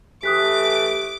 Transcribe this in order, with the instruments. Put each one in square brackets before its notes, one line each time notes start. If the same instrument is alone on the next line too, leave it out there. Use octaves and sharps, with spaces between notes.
[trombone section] E3 A3 [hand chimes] G4 [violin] D6 [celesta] D#6 F#6 B6